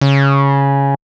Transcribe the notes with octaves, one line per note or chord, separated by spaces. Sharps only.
C#3